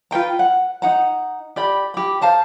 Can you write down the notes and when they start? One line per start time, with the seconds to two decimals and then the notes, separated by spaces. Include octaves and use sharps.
0.11 F4 B4 G5 A#5
0.39 F#5
0.82 D#4 F#5 A#5
1.56 G4 D5 B5
1.94 G4 B5
2.22 C5 F5 A5 A#5